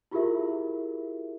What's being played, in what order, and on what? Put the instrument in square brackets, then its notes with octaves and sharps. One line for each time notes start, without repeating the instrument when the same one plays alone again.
[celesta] E4 F4 G4 G#4 A#4 E5